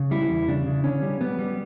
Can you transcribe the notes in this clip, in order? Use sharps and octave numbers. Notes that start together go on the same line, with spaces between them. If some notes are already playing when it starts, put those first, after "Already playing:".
Already playing: C#3
G3 E4
E2
C#3 D4
C#3
D3 C#4
G3
G3 B3
G3